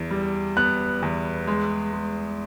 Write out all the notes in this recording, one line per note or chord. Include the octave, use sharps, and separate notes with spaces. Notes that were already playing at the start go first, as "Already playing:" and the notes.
Already playing: E2
G3
B3 F#6
E2
G#3
G#3